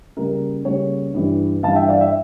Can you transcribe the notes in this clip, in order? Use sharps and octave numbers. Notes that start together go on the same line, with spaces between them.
C#3 G3 A#3 A#4
C#3 G3 A#3 C#5
G2 E3 G3
G2 E3 G3 F5 A5
E5 G5
D5 F5
E5 G5